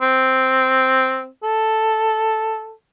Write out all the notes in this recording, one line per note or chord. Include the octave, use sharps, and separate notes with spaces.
C4
A4